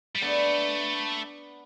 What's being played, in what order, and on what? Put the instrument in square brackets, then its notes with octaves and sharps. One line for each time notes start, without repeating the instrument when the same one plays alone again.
[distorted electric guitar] G3
[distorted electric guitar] A3 [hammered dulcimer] B3 D4